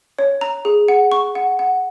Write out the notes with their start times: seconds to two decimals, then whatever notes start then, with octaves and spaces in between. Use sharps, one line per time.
0.19 C#5
0.41 A#5
0.65 G#4
0.88 F#5
1.12 C#6
1.35 F#5
1.59 F#5